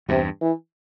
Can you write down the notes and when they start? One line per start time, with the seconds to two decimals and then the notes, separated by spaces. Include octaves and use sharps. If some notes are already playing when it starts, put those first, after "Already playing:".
0.08 E2 G2 C3
0.41 E3